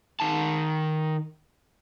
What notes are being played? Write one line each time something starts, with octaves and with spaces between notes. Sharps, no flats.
D#3 A5